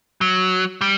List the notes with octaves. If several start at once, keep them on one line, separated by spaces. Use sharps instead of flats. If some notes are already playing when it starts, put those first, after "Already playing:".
F#3
G3